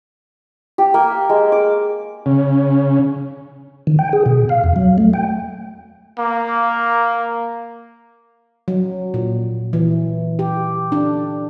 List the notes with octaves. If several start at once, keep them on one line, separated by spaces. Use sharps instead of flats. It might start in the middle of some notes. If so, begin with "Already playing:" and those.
G4
A#3
G#3
D6
C#3
D#3
G5
G#4
B2
F5
E2
F#3
A3
G5
A#3
F#3
A#2
E3
G4
D4